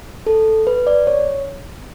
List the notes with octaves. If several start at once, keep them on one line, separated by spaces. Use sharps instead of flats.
A4
B4
D5
C#5